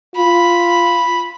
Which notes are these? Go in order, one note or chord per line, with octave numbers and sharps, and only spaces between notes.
F4 B5